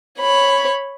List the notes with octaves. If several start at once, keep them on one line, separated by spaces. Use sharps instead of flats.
C#5 B5